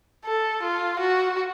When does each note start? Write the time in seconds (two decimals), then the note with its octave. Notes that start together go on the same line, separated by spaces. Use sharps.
0.25 A4
0.63 F4
0.99 F#4